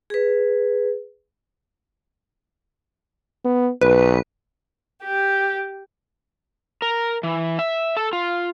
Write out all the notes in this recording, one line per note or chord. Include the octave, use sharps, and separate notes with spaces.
G#4 B4
B3
B1 B4
G4
A#4
E3
E5
A4
F4